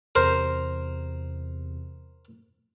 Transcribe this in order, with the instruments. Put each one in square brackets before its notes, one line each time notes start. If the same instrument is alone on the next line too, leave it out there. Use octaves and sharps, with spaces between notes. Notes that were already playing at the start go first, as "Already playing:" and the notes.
[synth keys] E2 C3 [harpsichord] A#4 C5